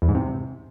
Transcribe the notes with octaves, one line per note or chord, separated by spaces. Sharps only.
E2
G#2
C3